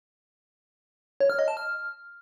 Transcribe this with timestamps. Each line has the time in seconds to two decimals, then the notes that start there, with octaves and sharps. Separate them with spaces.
1.20 C#5
1.30 F6
1.39 D#5
1.48 A5
1.57 F6